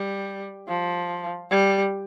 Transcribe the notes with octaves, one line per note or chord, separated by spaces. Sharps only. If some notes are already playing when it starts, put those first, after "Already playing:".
Already playing: G3
F3
G3